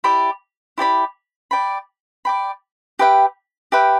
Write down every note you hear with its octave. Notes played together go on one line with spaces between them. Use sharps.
E4 G4 D5 B5
E4 G4 D5 B5
D5 G5 B5
D5 G5 B5
G4 B4 E5 G5
G4 B4 E5 G5